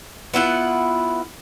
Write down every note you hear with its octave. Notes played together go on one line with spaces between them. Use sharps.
B3 E4 F4 F#5